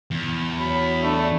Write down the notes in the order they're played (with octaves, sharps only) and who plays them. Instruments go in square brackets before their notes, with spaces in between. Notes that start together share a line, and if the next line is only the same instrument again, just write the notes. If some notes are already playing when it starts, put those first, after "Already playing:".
[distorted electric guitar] E2
[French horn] F#3 [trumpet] B5
[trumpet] A3 [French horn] D4